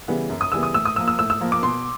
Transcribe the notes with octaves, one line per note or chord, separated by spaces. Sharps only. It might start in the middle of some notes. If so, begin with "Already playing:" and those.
C#3 E3 G3 B3
F#2
D#6
C#3 E3 G3 B3 E6
D#6
A2 E6
D#6
F3 A#3 E6
E6
A2 E6
E6
F3 A#3
D6
B2 C6